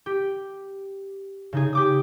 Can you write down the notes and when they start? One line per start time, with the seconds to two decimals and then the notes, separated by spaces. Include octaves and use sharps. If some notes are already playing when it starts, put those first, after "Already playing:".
0.06 G4
1.53 C#3 D#4 G#4
1.73 G4 D6 D#6